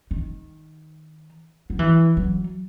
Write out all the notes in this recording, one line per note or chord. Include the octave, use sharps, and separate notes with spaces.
D#3
F#3
E3
F#3